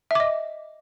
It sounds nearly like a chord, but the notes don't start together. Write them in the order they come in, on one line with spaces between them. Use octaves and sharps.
E5 D6 D#5